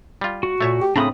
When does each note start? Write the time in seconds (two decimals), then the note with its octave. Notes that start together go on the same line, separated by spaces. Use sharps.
0.21 G3 F4
0.43 F#4
0.61 A#2 A3 C#5 E5
0.81 G4
0.96 A2 C#3 C4 D4 A#5 B5 D#6